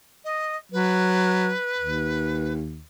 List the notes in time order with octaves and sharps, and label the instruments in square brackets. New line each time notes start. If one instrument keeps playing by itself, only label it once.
[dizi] D#5
[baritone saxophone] F#3 [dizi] B4
[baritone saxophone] D#2